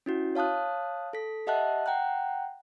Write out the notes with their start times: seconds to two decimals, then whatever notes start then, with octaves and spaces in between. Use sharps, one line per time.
0.06 C#4 E4 F#4
0.35 C#5 F5 A5 D#6 F#6
1.13 A4 B6
1.47 G4 D#5 E5 F#5 A5 F#6
1.86 F#5 G5 A#5 F#6